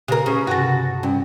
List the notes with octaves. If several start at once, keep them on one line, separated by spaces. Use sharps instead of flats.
C#3 G4 A#4 B4
C#3 C#4
G2 C3 F#4 A4 A#6
G2 C#4